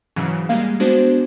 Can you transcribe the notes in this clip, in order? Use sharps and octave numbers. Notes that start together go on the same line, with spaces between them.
G#2 C#3 E3 F#3
G3 G#3 A#3 F5
G#3 B3 D4 F#4 C5